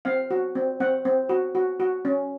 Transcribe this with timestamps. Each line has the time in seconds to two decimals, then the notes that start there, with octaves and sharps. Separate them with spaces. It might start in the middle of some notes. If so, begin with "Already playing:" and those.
0.05 C4 F5
0.31 F#4
0.55 C4
0.80 C4 F#5
1.05 C4
1.29 F#4
1.55 F#4
1.80 F#4
2.05 C#4